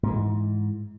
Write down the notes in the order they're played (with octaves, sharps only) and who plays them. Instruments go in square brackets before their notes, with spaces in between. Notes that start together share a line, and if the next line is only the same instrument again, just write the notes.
[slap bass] G#2 E3